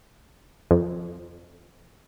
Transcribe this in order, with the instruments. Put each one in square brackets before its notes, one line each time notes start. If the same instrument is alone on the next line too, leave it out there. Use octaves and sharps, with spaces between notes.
[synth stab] F2